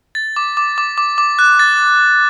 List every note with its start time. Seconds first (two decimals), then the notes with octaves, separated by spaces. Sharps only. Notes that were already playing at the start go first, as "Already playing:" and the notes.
0.15 A6
0.36 D6
0.57 D6
0.78 D6
0.98 D6
1.18 D6
1.39 F#6
1.59 A6